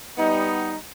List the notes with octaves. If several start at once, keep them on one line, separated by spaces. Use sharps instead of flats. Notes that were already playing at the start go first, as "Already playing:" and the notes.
G3 B3 D#4